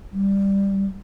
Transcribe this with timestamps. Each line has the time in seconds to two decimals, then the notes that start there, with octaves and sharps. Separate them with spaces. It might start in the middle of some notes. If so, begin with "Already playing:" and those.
0.12 G3